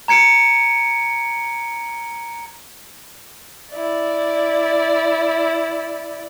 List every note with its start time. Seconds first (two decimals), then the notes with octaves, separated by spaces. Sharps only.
0.08 A#5 G#6 C#7 D7
3.73 E4 D5